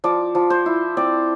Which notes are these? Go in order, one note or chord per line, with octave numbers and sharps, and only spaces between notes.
F3 D5
F3
C5
E4
C4 D5